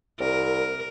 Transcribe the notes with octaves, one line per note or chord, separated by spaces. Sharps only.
C2 A#4